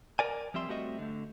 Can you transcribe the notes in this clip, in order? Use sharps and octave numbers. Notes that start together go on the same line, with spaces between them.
A#4 D5 G#5
F3 G3 C4 E5 C6
G3 A3 C4 F#4 D#5 E5
D3 A3